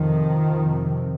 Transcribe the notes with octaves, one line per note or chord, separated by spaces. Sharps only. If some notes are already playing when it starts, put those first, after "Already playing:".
Already playing: F2 C3 D#3 F3
F2 C3